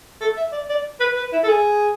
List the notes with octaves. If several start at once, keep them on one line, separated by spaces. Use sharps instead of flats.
A4
E5
D5
D5
B4
B4
E4
A4
G#4